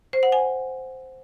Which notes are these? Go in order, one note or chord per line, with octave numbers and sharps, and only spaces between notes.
C5
F#5
G#5